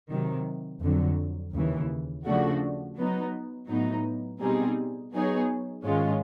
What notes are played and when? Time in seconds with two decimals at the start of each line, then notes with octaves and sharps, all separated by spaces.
0.10 C3 D#3 F#3
0.82 F2 D3 F#3
1.54 D#2 C#3 E3
2.26 C#3 F3 A3 D4 F#4
2.97 F#3 B3 D#4
3.69 A2 F#3 B3 D#4
4.40 B2 G3 C4 D#4 G#4
5.13 F#3 B3 D#4 G#4 C#5
5.85 G#2 D#3 G#3 C#4 F4